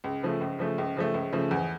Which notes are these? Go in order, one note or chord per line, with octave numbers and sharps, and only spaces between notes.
C#2
C#3 F3 A3
C#2
C#3 F3 A3
C#2
C#3 F3 A3
C#2
C#3 F3 A3
E2